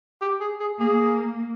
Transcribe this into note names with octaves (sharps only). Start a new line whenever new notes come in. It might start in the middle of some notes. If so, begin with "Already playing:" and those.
G4
G#4
G#4
A#3 G#4